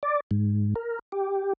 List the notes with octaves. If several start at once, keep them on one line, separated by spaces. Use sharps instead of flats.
D5
G#2
A#4
G4